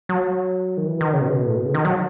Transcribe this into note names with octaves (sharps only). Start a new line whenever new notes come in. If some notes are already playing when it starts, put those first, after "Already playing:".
F#3
D#3
E3
D#3
C#3
B2
C#3
B2
A2
B2
C#3
D#3
F#3